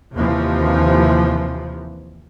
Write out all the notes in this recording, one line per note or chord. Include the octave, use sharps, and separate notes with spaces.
D#2 C3 E3 F3